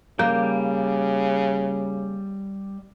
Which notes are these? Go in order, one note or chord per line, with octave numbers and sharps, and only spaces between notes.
C#3 G3 A#3 G6